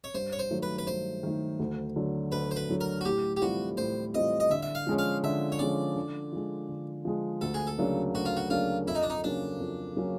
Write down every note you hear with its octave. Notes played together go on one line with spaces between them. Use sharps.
C#5
G2 C5
C#5
C5
D#3 F#3 A3
B4
B4
G2 C5
D#3 F#3 A3
D2
D3 F#3
D2 B4
C5
B4
D3 F#3
A#4
F#4
A2 G4
G4
E3 G3 C4 F4 F#4
A2 C5
E3 G3 C4 F4 D#5
D#5
D3 E5
E5
F5
F3 G#3 C#4
F5
D3 E5
C#5
F3 G#3 C#4 D5
D3
F3 G#3
D3
F3 G#3
D2 A4
G#4
A4
C#3 F#3 A#3 D4
D2 F#4
F4
F#4
C#3 F#3 A#3 D4 F4
F2 E4
D#4
D4
D#4
C#3 F#3 A#3 C#4 D4
F2
C#3 F#3 A#3 C#4